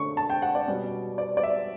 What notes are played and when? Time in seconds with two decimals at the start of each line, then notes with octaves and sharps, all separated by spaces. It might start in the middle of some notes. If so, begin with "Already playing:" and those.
Already playing: D3 A3 C#4 C#6
0.17 A5
0.30 G5
0.42 F#5
0.55 D5
0.67 B2 G3 C#4
1.18 D5
1.37 D5
1.43 E5